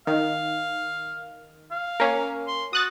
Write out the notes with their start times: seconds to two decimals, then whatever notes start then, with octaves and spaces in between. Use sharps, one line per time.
0.07 D#3 F5
1.71 F5
2.00 A#3 C#4
2.48 C6
2.73 F#4 D#6 F#6 A6